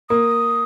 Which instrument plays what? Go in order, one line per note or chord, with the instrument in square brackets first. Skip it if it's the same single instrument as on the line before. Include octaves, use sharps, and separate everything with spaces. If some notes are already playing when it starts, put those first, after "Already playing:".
[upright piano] A#3 [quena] D#6